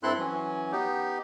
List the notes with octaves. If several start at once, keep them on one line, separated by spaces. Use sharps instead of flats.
G2 C4 E4 A4 C6 F#6
E3 F#3 C#4
B3 D#4 G4